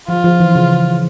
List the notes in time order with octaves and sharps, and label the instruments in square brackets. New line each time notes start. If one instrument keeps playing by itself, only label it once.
[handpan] F3 [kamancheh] F4
[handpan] F3
E3
C#3